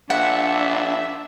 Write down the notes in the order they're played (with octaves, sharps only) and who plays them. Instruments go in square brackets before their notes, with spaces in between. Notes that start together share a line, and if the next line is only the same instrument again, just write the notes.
[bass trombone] A#1 [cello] D4 [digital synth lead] E5 [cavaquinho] F#5